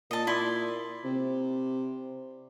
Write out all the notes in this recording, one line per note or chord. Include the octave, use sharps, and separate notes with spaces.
A#2 D#5 A5
E4 D5 C6
C3